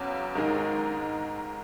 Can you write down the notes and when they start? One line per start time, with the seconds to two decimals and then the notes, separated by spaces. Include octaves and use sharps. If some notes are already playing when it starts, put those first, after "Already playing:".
Already playing: E2 C#3 F#3
0.35 G#2 D#3 G#3 D#4